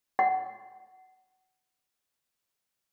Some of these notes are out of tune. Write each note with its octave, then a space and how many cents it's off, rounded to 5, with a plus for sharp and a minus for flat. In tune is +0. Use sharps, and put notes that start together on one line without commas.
F#5 +20